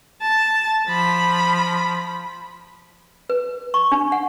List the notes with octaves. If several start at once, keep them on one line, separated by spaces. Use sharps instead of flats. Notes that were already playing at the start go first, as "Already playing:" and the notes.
A5
F3 B5
B4
C#6
D4
F#5